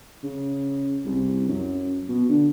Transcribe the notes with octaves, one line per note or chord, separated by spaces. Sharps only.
C#3
C2
F#2
B2
D3